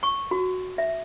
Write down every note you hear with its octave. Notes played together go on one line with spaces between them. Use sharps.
C#6
F#4
E5